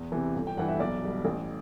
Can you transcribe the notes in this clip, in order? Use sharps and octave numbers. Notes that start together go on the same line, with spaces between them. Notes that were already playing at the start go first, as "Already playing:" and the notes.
Already playing: E2
C3 E3
G1
G5
G2 E3 F#5
E5
B1 D5
B2 G3
A1